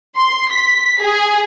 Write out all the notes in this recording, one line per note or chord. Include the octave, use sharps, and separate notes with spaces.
C6
B6
G#4